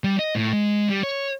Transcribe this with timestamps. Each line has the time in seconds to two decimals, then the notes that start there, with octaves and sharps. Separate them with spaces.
0.04 G3
0.19 D#5
0.35 A2
0.53 G#3
0.89 G3
1.03 C#5